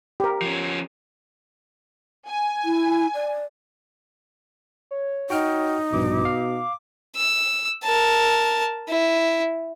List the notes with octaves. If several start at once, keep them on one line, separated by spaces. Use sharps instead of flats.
G4 A#4
F3 C#4
G#5
E4
D5
C#5
D#4 F#4 G5 F6
A#1 G2 B2 D6
F5
E6
A#4 A5
E4